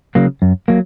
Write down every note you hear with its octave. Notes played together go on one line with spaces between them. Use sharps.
C#3 F#3 A#3
F#2
F#3 A#3